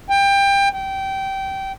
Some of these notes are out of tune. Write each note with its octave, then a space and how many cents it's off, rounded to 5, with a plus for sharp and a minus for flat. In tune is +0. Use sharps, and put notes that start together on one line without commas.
G5 +25
G5 -20